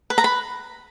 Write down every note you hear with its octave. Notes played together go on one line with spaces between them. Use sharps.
B4
A#5
B5